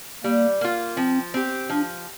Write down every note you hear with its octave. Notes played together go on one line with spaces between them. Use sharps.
G3 A#3
A#3 F4
F3 C4
C4 G4
F3 D4